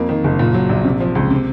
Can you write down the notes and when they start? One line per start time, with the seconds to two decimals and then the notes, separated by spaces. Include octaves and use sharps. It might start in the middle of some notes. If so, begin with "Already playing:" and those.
Already playing: F2 A#3
0.09 D#3
0.24 F#1
0.39 A#2
0.54 F#3
0.69 A#1
0.84 C3
1.00 F3
1.15 C#2
1.30 C3